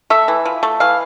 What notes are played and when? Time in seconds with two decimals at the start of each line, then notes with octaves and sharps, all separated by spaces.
0.10 A3 E5
0.28 E3
0.45 F3
0.63 A3
0.80 E3 F5